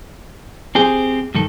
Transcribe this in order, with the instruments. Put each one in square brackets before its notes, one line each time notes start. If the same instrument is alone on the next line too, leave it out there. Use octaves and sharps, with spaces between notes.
[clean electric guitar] C4 G4 C5 [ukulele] G#4
[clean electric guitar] G2 D#3 A4